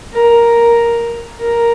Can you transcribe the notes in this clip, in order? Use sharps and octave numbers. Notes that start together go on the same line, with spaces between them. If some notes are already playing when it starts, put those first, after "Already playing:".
A#4
A#4